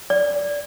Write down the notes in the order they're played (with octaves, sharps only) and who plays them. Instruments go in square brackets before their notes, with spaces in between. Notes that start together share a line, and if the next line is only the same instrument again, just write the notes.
[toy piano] D5